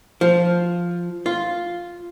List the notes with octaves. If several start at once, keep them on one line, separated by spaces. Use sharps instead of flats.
F3
F4